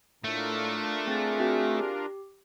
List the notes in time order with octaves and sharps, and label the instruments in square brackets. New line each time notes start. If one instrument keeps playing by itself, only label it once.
[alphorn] A2 [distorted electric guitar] A3 [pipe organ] D4 F4 A#4
[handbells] C4 A6 [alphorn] G#4
[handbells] C4 F#4 E5
G4